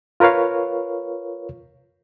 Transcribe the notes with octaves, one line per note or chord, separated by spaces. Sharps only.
F4 A#4 B4 C#5 F5